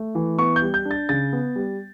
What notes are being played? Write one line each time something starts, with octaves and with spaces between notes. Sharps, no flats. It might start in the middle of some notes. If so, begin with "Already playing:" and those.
Already playing: A3
E3
B3 C#6
G6
G3
G6
D4
A6
C#3 A6
B3
G3